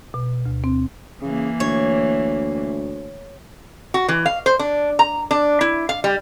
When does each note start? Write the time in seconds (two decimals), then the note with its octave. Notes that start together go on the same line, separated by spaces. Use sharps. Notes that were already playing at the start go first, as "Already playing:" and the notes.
0.14 B2
0.45 D2
0.64 C4
1.22 C#3 E3 A#3
1.60 D2 C#5
3.94 F#4
4.09 E3
4.26 F5
4.46 C5
4.59 D4
4.99 A#5
5.31 D4
5.61 E4
5.89 F5
6.04 G3